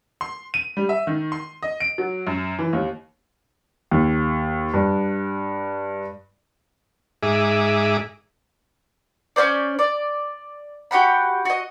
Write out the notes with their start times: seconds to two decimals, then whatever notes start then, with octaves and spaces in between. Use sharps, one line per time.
0.21 C6
0.54 D#7
0.77 G3
0.89 E5
1.07 D#3
1.32 C6
1.62 D#5
1.80 D7
1.98 F#3
2.27 F#2
2.59 E3
2.73 D#2
3.91 D#2
4.74 G2
7.23 G#2 G#4 E5 D6
9.36 C#4 F4 C5 D5
9.79 D5
10.91 F#4 G4 F#5 B5
11.45 F#4 D#5